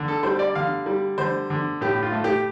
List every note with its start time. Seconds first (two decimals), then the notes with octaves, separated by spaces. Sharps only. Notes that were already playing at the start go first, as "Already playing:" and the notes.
Already playing: D3
0.08 A4
0.23 G3 C5
0.39 D5
0.55 D3 F5
0.86 G3
1.18 D3 C5
1.50 D3
1.81 A2 G4
2.03 F4
2.13 A3
2.24 G4